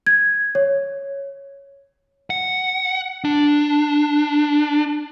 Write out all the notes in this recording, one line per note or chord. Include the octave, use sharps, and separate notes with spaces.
G#6
C#5
F#5
D4